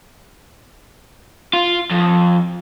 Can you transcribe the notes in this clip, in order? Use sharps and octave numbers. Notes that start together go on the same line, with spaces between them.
F4
F2